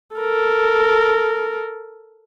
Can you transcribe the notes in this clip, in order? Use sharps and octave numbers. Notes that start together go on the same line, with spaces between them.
A4 A#4